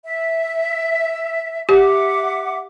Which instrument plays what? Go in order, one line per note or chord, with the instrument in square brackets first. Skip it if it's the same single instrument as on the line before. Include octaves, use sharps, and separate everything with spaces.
[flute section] E5
[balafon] G4 [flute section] E5 F#5 D6